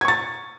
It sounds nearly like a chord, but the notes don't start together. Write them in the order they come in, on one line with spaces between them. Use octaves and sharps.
G#6 C#6 A6